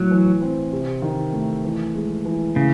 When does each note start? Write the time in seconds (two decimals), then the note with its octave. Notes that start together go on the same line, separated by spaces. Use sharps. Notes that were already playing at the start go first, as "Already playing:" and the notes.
Already playing: A2 F#3
0.11 E3
0.42 C4
0.73 C3
1.02 D#3
1.33 A3
1.64 E3
1.95 G#3
2.25 E3
2.56 A2 C#3